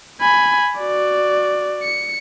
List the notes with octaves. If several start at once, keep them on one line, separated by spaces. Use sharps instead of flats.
G#5 B5
F#4 D5
C#7